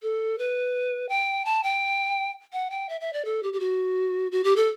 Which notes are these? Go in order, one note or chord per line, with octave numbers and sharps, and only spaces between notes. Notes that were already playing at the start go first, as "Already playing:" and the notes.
A4
B4
G5
A5
G5
F#5
G5
E5
E5
D5
A4
G4
G4
F#4
F#4
G4
A4